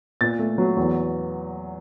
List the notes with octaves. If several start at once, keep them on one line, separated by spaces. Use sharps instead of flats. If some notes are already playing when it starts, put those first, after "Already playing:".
A#2 A6
A3
F#3
E2